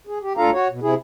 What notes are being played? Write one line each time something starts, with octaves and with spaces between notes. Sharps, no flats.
G#4
G4
D2 D4 F4 A4 F5 A#5
F#4 C#5
B2
C3 E4 G#4